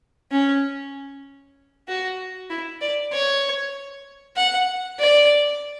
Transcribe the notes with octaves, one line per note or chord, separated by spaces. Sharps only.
C#4
F#4
E4
D5
C#5
F#5
D5